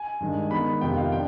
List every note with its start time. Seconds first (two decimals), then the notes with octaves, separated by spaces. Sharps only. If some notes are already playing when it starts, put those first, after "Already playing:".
Already playing: G#5
0.20 G2 D#3 G#3
0.51 D#3 G#3 B3 B5
0.81 F2 C3 D#3 B3 F4 G5
0.97 F5
1.12 D4 G5